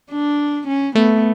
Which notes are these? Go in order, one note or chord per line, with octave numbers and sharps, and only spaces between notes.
D4
C#4
A3 B3